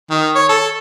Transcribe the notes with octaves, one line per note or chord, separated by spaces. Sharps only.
D#3
C#5
A4